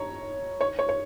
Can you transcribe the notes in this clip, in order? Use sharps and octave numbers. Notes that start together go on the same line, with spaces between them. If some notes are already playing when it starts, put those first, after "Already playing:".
Already playing: C#5 A#5
C#5
C#5
C#5